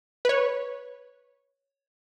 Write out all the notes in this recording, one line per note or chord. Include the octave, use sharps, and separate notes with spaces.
B4 C#5